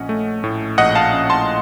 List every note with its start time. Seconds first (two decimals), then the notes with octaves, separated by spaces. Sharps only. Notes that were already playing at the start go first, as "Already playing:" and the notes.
Already playing: A#1 C#4 D#5 F#5
0.09 A3
0.44 A2
0.78 A#1 D#5 F#5
0.95 F5 A5
1.13 C#4
1.30 A5 C6